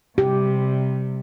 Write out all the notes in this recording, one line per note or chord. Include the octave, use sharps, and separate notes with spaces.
C3 G3 G4